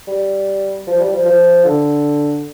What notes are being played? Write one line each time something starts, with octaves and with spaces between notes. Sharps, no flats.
G3
F3
G3
F3
F3
D3